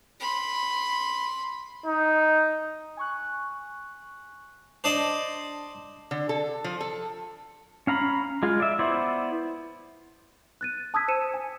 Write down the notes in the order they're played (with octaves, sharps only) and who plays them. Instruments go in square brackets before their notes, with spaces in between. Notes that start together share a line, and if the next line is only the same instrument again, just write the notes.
[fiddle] B5 C6
[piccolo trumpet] D#4
[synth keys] G#5 C#6 F#6
[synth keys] D4 A5 [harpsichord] C5 D5 D#5
[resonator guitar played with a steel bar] D3
A4
F3
A4
[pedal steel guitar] C#4 F5 A#5 B5
G#3 F4
D5 E5
B3 E4 C5 D5
[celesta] F#6 A6 D#7
A5 D#6 E6 G#6 B6
C5 C#7 D#7 E7
G#5